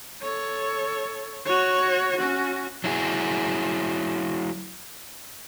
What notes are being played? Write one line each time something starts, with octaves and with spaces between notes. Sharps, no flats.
A4 C#5
F#4 C#5
C#4 F#4
F#3 E4 G#4